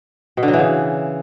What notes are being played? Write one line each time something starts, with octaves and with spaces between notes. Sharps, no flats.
B2
D3
F#3
E3
C#3